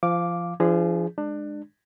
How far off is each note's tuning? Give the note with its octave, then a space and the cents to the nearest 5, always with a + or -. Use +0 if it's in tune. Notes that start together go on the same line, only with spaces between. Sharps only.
F3 -25 F5 +0 D6 +0
F3 -35 D4 +0 G#4 +0
G#3 +0 D4 +25